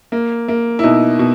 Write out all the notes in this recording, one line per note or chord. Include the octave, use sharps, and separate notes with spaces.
A#3
A#3
E4
B2 D#4
B2